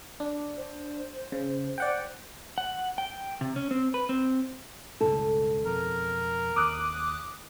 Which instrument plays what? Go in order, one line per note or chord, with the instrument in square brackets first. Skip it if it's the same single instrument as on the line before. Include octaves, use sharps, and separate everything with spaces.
[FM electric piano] D4
[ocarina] C5
[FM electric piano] C#3
D5 F#5 G5
[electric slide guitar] F#5
G5
C3
C#4
C4
B4
C4
[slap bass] C#2 G2 B2 [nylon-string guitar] A4
[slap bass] F2 B2 F3 [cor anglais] A#4
[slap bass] D#2 [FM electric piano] D6 D#6 F#6